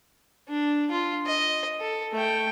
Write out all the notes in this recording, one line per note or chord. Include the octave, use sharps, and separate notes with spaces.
D4
F4
D#5
A4
A3 G5